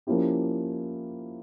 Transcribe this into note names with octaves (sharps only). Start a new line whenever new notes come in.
F3 A#3 C#4 E4 G4